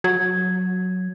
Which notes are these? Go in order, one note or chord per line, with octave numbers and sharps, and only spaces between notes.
F#3 G#6